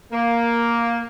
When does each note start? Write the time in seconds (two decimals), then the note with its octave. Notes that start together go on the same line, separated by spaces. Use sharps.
0.12 A#3